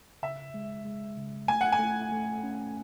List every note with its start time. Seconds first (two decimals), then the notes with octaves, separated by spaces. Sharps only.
0.23 C#3 E5
0.54 G#3
0.85 G#3
1.17 C#3
1.48 A3 G#5
1.61 F#5
1.72 G#5
1.79 A3
2.12 A3
2.43 C#4